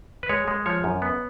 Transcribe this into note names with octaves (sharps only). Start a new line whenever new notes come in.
B4
G#3 C#5
G#3
F3 C#5
F#2
B3